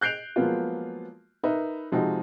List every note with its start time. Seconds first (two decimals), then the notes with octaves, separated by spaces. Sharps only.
0.01 F#6 G6 C7 D7 F7
0.36 F3 F#3 G#3 A#3 B3 F4
1.43 D#4 A#4 B4 E5
1.92 C3 F3 G#3 D#4 F#4